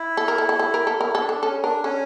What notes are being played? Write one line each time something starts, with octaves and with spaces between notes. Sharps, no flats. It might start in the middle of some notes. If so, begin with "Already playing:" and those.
Already playing: E4
A4
A#4
A4
A4
A4
A#4
A4
E4 A#4
A4
D4
A4
C#4 A4
D4 A#4
C#4 A4